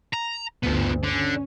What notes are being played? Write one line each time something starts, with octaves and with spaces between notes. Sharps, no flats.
A#5
G1 D2 F3 B3
D3 C#4